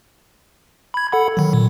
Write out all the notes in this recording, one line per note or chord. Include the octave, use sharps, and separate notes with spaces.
B5 G#6
A4 F#5 B5
D#3 F#3
A#2